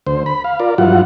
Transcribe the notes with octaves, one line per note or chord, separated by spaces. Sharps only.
D2 C5
B5
F5
F4 A#4 D5
G2 F3 F#3 E4 F4 F#5